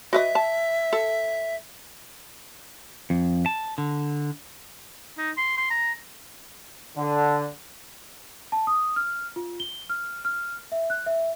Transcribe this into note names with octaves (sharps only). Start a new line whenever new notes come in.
F#4 B4 D#5 E5
A5
A4
F2
A5
D3
D#4
C6
C6
A#5
D3
A5
D#6
F6
F4
G7
F6
F6
E5
F#6
E5